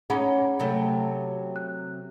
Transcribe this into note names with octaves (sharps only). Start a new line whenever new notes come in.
C#4 D#4 G#4 F#5 B5
C3 F#3 A3
F#6